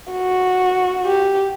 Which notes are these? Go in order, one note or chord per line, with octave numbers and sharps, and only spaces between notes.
F#4
G4